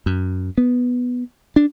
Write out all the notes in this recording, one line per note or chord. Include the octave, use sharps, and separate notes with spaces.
F#2
B3
D4